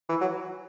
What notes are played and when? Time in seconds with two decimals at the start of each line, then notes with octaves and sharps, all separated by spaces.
0.09 E3
0.21 F#3